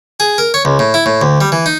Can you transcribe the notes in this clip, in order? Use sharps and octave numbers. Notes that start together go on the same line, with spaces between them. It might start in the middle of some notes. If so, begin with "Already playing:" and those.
G#4
A#4
C#5
C#2
A2
E4
A2
D2
G3
E3
D#4